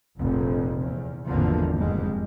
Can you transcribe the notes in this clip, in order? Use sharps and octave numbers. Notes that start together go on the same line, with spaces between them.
F1 A#1 F2
E2
G#1 E2 D3 F3 A#3 B3
F1 F2 G#2 G3 G#3